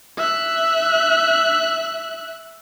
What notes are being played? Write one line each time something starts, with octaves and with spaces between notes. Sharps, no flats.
E5 F#6